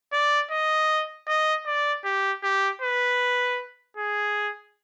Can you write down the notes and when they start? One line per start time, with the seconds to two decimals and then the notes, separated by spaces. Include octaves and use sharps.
0.13 D5
0.51 D#5
1.28 D#5
1.66 D5
2.05 G4
2.43 G4
2.82 B4
3.97 G#4